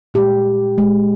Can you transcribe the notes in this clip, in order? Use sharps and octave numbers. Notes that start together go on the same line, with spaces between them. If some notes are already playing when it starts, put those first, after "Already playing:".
A#2 G#3 G4
A#2 G#3